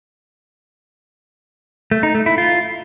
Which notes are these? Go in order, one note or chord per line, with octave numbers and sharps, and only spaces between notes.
A3
D#4
A3
E4
F4